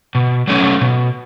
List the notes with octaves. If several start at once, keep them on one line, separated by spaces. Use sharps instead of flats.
B2
F#3 A3 C#4
B2